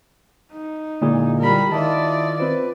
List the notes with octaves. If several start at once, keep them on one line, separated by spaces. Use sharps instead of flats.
D#4
A#2 D3 G#3 E4 G#4
G3 A#4 B5
D#3 E4 F4 D5 D#5 A5
C4 F4 B4 C5